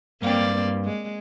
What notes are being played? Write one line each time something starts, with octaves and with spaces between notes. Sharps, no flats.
G2 A#3 C4 D5 F5 G5
G#3